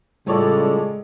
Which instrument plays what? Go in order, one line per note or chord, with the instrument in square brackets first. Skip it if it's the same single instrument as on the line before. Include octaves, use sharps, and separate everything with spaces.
[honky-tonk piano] A2 C#5 D5 [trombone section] C#3 A4 [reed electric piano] G3 F4 [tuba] G#3